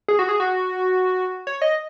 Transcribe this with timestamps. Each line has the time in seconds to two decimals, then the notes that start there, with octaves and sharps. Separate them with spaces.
0.08 G#4
0.19 F#4
0.29 G#4
0.40 F#4
1.47 C#5
1.62 D#5